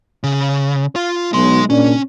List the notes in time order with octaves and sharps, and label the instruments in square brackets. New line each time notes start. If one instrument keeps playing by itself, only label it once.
[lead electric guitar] C#3
F4
[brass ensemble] B1 [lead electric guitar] G#3 C6
[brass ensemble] A#2 C#3 D4 [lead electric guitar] C#4